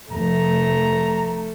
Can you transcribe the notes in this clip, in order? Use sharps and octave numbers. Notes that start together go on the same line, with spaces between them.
F1 A3 A#5